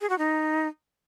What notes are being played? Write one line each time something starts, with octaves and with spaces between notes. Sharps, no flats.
G#4
F#4
D#4